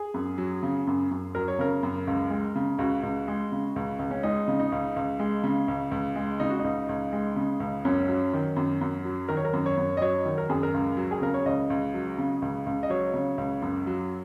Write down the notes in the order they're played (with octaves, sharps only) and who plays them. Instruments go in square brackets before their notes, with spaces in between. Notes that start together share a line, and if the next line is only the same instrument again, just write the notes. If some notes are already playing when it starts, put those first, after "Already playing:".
Already playing: [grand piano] G#4
F#2
F#3
C#3
F#2
F#2
F#3 A#4
C#5
C#3 A#4
F#2
C#2
G#3
C#3
C#2 F#4
C#2
G#3
C#3
C#2
C#2
C#4
G#3 D#4
C#3
D#4
C#2
C#2
G#3
C#3
C#2
C#2
G#3
C#3 D#4
F#4
C#2 D#4
C#2
G#3
C#3
C#2
F#2 C#4
F#3
D#3
F#2
F#2
F#3
D#3 A#4
C#5
A#4
F#2
C#5
F#2
D#5
F#3 C#5
D#3
A#4
F#2 G#4
A#4
C#2
F#3
G#4
C#3 A#4
C#5
C#2 D#5
C#2
F#3
C#3
C#2
C#2
D#5
F#3 C#5
C#3
C#2
F#2
F#3